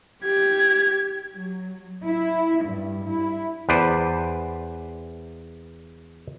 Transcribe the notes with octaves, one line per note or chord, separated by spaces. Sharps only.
G4 G#6
F#3
E4
G2
E4
E2 B4 C5 D5